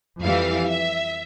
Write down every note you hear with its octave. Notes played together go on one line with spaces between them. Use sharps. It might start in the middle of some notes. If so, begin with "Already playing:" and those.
F2 E3 G3 F5
E5